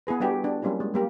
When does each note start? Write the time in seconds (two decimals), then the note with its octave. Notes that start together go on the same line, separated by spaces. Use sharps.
0.07 B3 E4 G#4 B4
0.20 G3 B3 D4 F#4 G4 A4
0.44 B3 D4
0.62 F#3 G3 A#3 C#4 E4 G4
0.80 G#3
0.94 G3 A#3 G4